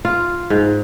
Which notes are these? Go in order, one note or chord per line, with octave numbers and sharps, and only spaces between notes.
F4
G#2